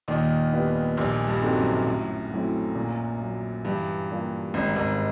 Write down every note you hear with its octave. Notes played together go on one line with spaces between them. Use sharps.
D#2 A#2 D#3
G3 B3 D4 F4
A#1 A#2 G3
G2
C4 D#4 F#4 A4
F#2
A2
F#3 A3 C4 E4
A#2
F#3 A#3
G2 E3
G3 A#3 D4 F4
G#1 G#2 C#3
G#1 G#2